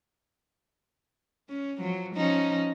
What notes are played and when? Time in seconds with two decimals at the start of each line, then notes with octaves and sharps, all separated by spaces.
1.49 C#4
1.78 F3 F#3
2.15 F3 C#4 D#4